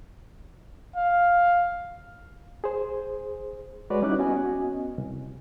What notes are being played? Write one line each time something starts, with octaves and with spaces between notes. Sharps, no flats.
F5
G#4 C5
G#3 F#4 B4 C#5 D5
G3 C#4 D#4 E4 D6 F#6
B3 C#4 F#4 D#5 G#5
C2